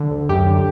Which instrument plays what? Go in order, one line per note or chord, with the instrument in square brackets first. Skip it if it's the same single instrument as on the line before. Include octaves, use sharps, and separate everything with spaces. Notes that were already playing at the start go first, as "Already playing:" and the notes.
Already playing: [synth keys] D3
D2
F#2 G4
D3